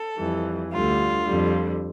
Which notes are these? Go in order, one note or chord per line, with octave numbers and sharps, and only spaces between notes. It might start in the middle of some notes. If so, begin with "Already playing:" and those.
Already playing: A4
F2 E3 G3
D2 D3 G3 F4
F2 D3 G3